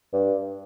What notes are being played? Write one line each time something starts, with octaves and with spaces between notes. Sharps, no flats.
G2